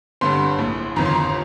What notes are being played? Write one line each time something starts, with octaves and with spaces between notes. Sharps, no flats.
G1 G2 D3 C6
A#1 A2
G1 F2 D#3 A#5
C6
A#5